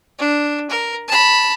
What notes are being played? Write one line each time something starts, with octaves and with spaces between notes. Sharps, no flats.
D4
A#4
A5 B5